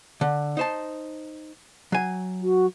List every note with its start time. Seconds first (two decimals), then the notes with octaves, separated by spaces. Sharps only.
0.21 D3
0.57 D#4 C5 A5
1.92 F#3 G#5
2.42 F#4